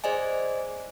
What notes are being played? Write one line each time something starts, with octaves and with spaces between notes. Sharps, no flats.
G#4 C5 D5 D#5 G#5